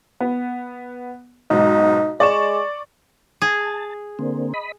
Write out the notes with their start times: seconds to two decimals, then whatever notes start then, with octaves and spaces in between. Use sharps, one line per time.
0.20 B3
1.50 B1 G#2 D#4
2.20 G#3 D5 C#6 E7
3.42 G#4 A5
4.19 D3 A#3 C4
4.54 D#5 B5